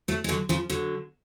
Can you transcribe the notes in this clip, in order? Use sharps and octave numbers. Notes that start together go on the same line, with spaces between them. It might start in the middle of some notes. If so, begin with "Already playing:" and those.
F#3 A3
G#3
D3 F#3
C#3 F3
D3 F#3